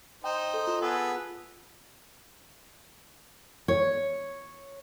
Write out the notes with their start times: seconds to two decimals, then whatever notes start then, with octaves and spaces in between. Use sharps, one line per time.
0.24 D#4 C5 G5
0.54 A4
0.67 F4
0.81 B3 G#4 A4
3.68 C#5